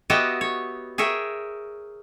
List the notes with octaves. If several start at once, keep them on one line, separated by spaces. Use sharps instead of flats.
B3 F#4 G4 D#5 E5 G5
C#5
G#4 A#4 C#5 E5 G5